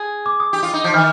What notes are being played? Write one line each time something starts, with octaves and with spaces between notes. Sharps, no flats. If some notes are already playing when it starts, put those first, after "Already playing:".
Already playing: G#4
D6
D#6
G4
F4
D#4
F3 G6
D#3 F6